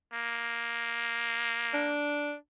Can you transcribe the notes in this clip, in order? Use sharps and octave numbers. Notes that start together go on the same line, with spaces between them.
A#3
D4